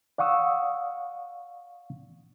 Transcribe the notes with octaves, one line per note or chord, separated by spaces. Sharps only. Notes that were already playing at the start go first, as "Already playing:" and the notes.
D5 F5 F#5 C#6 D#6 E6